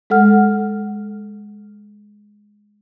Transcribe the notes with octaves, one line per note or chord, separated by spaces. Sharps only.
G#3 A4 F#5 F6